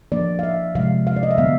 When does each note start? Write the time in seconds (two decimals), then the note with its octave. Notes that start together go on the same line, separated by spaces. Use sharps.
0.12 F3 A#3 D4 D5
0.39 F5
0.43 E5
0.75 C3 F3 G#3 F5
1.07 F5
1.16 D5
1.23 D#5
1.31 E5
1.38 D3 F#3 B3 F5